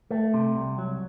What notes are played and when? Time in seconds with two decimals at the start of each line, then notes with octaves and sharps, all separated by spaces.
0.11 A3
0.34 C3
0.55 C2
0.78 F#3